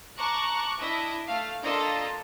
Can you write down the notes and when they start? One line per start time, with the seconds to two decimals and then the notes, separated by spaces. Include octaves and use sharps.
0.17 A5 A#5 C#6 D6 F#6
0.79 D4 E4 D#5 E5
1.26 A3 F5
1.61 A#3 D4 F4 A4 D#5